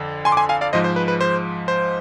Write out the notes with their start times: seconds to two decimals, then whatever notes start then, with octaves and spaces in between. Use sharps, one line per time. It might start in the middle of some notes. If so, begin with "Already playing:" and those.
Already playing: F2 D3
0.25 G#5 C6
0.32 D6
0.37 G#5 C6
0.49 F5 G#5
0.61 D5 F5
0.73 G#2 F3 G#3 C5 D#5
0.84 C5
0.96 B4
1.08 B4
1.21 C5
1.68 C5